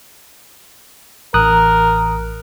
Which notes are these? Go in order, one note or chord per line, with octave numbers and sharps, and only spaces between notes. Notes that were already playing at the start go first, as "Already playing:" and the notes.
A1 A#4 D#6 F#6